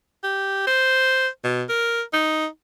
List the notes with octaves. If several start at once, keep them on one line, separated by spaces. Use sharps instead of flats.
G4
C5
B2
A#4
D#4